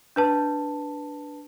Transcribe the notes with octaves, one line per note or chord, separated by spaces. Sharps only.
D4 B4 A5